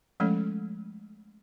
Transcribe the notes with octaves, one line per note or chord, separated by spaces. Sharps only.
F3 G#3 A3 C#4 A4 C#5